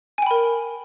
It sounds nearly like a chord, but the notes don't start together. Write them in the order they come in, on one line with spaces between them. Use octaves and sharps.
G#5 G5 B5 A#4